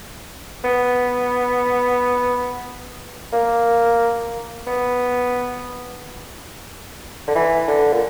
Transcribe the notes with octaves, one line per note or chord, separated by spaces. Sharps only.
B3
A#3
B3
D3
E3
D3
A#2